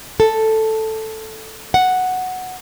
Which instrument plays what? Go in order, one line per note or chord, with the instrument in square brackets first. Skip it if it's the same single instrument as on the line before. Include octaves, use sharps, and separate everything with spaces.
[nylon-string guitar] A4
F#5